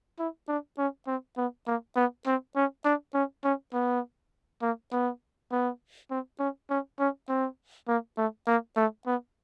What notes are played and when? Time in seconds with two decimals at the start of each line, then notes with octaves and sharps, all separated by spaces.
0.19 E4
0.48 D4
0.78 C#4
1.07 C4
1.37 B3
1.67 A#3
1.96 B3
2.26 C4
2.56 C#4
2.85 D4
3.14 C#4
3.44 C#4
3.73 B3
4.62 A#3
4.92 B3
5.52 B3
6.10 C4
6.39 C#4
6.70 C#4
7.00 C#4
7.29 C4
7.88 A#3
8.18 A3
8.47 A#3
8.77 A3
9.06 B3